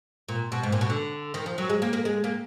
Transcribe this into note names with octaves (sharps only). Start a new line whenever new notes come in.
A#2
B2
G#2
A#2
B2
D3
D#3
F3
F#3
G#3
A#3
A#3
G#3
A#3